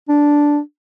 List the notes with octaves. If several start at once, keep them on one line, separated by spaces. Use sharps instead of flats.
D4